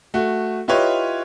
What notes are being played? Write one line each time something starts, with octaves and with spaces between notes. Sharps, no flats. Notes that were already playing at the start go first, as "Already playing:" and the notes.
A3 F#4
E4 F4 G4 B4 C#5 D#5